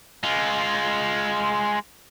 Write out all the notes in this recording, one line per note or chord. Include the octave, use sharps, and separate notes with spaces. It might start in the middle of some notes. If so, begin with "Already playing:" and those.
G#3 F4